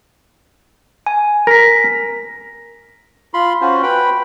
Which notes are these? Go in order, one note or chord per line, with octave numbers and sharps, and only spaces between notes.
G#5
A#4 A#6 B6
F4 B5 C6
C#4 F4 F#4 C5
B4 G5 B5